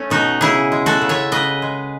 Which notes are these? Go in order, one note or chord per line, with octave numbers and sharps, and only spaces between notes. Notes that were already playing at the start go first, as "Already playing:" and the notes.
Already playing: A3 C#4
B2 D#4 F#4
C#3 E4 G#4
G#3
F#4 A4
C#3
C#5 E5
C#3 B4 D#5
G#3